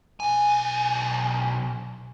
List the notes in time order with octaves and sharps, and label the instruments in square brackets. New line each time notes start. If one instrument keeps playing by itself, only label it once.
[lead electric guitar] B1 G#5